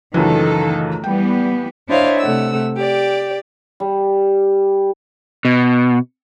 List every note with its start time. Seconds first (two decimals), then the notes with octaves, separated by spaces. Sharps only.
0.14 C#2 F#2 D#3 E3 A3 A4
1.04 E3 G3 B3 G5
1.88 D4 E4 C5 C#5 D#5 F5
2.20 C3 A3 F#5 E6
2.76 G4 D5
3.80 G3
5.45 B2